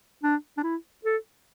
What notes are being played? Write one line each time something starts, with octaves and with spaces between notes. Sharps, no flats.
D4
D4
E4
A4